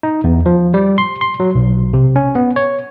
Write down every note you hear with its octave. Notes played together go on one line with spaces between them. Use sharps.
D#4
E2
F3
G3
C6
C6
F#3
B1
C3
C#4
B3
C#5